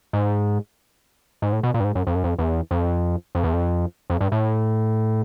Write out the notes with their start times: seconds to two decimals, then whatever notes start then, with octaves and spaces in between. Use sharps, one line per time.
0.13 G#2
1.42 G#2
1.52 A2
1.63 B2
1.74 A#2
1.80 G2
1.84 G#2
1.95 F#2
2.07 F2
2.15 F#2
2.24 F2
2.39 E2
2.71 F2
3.35 F2
3.44 E2
3.53 F2
4.10 F2
4.21 G2
4.32 A2